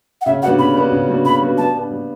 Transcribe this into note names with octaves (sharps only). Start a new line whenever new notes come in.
F#5
C#3 E5
G3 B3 D4 F#4 F#5
C#3 B5
G3 B3 D4 F#4
C#3
G3 B3 D4 F#4
C#3 B5
G3 B3 D4 F#4
G3 A5
B3 D4
G3